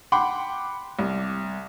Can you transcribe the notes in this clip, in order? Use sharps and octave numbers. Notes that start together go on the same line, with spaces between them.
F#5 G5 B5 C6 D6
C2